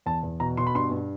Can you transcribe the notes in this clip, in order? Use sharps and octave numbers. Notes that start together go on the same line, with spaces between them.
E2 A5
E2
B2 A#5
B2 C6
B5
G2 C6
G2